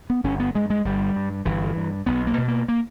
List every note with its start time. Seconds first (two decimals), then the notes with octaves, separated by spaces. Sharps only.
0.10 B3
0.24 G1 C#4
0.40 B3
0.55 G2 G#3
0.70 G#3
0.85 G1 G3
1.16 G2
1.45 G1 E3
1.76 G2
2.06 B1 B3
2.27 A#3
2.38 B2
2.48 A#3
2.68 A#3